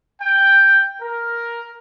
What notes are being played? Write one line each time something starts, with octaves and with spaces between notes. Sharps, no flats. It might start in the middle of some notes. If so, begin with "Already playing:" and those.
G5
A#4